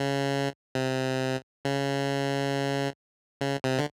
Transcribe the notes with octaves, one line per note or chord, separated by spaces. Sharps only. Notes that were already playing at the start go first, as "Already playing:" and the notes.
Already playing: C#3
C3
C#3
C#3
C3
D3